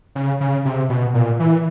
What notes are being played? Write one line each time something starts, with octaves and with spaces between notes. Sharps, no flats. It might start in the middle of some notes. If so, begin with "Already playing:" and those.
C#3
C#3
C3
B2
A#2
E3